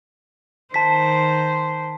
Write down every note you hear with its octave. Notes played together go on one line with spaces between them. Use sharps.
D#3 C5 A5 B6